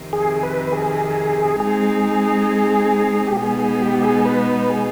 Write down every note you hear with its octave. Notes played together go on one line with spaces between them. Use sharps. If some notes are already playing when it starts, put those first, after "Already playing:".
Already playing: F2 C3 D#3
G#4
B4
G#4
G#3 C4 D#4 G#4
G4
B2 G#3 B3 D#4 G#4
G#4
G4
G#4
B4
G#4